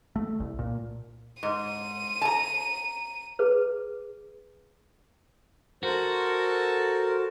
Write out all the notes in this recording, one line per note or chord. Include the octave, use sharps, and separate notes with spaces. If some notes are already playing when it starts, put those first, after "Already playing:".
A3
C2
A#2
G#2 D#7
A5 A#5
G#4 B4
F#4 A4 A#4 C5 A5